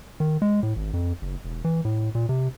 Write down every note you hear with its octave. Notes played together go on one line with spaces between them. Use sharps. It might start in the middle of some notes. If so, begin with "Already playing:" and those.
D#3
G#3
A2
G#1
F2
F#1
E1
E3
A2
A#2
C3